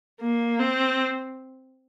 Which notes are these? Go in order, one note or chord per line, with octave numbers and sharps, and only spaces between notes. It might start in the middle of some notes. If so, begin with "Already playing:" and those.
A#3
C4